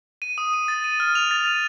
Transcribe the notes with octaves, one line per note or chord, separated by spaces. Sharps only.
D#7
D#6
D#7
A6
D#7
F6
F7
A6
D#7